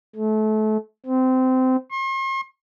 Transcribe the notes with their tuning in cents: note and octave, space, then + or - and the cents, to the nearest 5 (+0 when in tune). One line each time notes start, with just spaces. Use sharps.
A3 -30
C4 -20
C6 +45